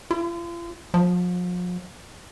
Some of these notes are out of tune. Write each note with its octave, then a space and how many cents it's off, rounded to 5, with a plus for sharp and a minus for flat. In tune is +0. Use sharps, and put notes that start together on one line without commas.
F4 -40
F3 +40